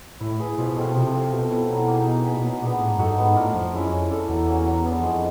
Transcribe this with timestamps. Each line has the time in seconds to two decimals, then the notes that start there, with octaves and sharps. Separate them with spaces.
0.20 A2 E4
0.40 G#4 B4
0.58 B2 F3
0.76 B2 A3 C4 F4
0.95 C3 F3
1.14 A3 C4
1.32 B2 C4
1.50 E4 A4
1.69 F#3
1.88 A#3 D#4 G#4
2.06 D#4
2.25 G#4 B4
2.35 A#2
2.43 B2 F#3
2.62 A#2 B3 D4
2.80 A2 A#3
2.90 G#2
2.98 F#2 D#4 F#4 A4
3.08 G2
3.17 G#2 B3
3.36 A2 D4 F4 A#4
3.54 F2 F3
3.73 F#2 G#3 C#4 E4
3.91 F2 C#4
4.11 E4 A4 D5
4.29 E2 F#3
4.47 A#3 C#4 F#4
4.66 F#3
4.85 B3 D4
5.03 F2 G#3